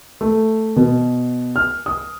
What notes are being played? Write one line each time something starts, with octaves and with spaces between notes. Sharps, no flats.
A3
B2
F6
D#6